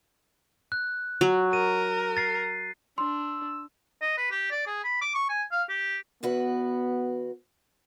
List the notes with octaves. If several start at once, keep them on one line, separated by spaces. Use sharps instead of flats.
F#6
F#3
A#4 D#7
A6 C7
D4 C6 E6
D#5
B4
G4
D5
G#4
B5
D6
C#6
G#5
F5
G4
E2 B3 F#4 B4